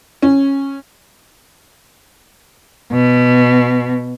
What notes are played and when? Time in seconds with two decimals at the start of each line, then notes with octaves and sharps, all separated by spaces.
0.22 C#4
2.92 B2